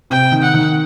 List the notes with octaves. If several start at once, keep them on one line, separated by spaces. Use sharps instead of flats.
C3 G5
D#3
F#5
D#3